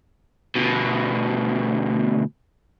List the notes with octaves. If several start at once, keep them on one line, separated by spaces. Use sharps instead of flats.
D2 B2